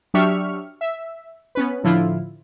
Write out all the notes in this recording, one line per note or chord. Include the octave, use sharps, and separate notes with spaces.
F#3 D4 G4 E5 C#6 F6
E5
B3 C#4 B4
A2 D3 F3 E4 F4